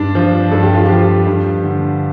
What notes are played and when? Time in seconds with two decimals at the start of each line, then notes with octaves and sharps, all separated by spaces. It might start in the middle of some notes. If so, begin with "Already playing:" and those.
Already playing: G2 D4
0.15 F3
0.52 G2 A4
0.63 G4
0.75 F4
0.86 F3 G4
1.27 G2
1.64 D3